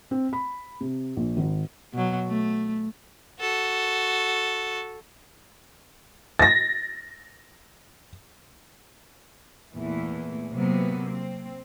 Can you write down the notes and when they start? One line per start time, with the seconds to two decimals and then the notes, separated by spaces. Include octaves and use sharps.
0.11 C4
0.33 B5
0.81 C3
1.17 A#1
1.37 G#1
1.93 B2 F#3
2.27 A3
3.40 F#4 A4
6.39 A6 A#6
9.72 E2 A#2 E3 A3
10.51 C3 F#3 A#3 B3
11.12 C4